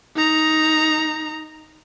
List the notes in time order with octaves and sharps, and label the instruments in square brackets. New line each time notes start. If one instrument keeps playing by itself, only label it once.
[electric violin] D#4 A#5